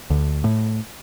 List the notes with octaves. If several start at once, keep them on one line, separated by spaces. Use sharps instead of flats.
D2
A2